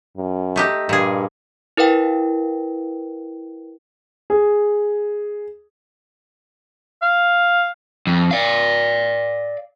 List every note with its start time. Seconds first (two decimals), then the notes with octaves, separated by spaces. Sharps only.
0.17 F#2
0.56 A3 D#4 G4
0.89 G2 A#2 G#4
1.77 E4 A#4 B4 F5 G5
4.30 G#4
7.02 F5
8.07 F2
8.31 D5 F5